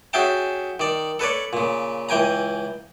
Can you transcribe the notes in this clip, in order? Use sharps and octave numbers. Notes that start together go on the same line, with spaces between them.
C#4 F#4 G#4 E5 G5 A5
D#3 D5
A4 B4 C#5 D5
A#2 C#3
C#2 E3 G5 G#5 A#5